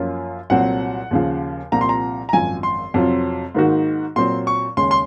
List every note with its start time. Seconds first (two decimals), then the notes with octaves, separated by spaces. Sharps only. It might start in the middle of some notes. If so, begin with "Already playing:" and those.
Already playing: F#2 F3 A#3 C#4 F4
0.50 C2 A#2 F#3 C4 F#5
1.11 D#2 C#3 F3
1.72 C2 A#2 F3 C4 A#5
1.81 C6
1.89 A#5
2.29 A#5
2.33 G#1 F#2 F3 G#5
2.63 C6
2.94 F2 C3 F#3 C4 F4
3.55 G#2 D#3 A#3 D#4 F#4
4.16 A#2 F#3 C4 C6
4.47 C#6
4.77 D#2 C#3 G#3 C#4 C6
4.91 C6